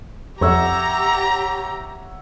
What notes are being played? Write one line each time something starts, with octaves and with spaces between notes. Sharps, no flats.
F2 G4 C#5 E5 F#5 A#5